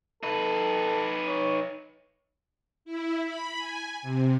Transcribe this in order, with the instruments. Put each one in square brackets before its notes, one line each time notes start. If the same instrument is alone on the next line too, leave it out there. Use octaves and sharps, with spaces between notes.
[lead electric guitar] D#4 B4 [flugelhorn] A4
[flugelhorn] C#5
[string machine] E4
B5
G#5
C3